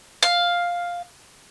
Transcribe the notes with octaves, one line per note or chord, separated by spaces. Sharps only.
F5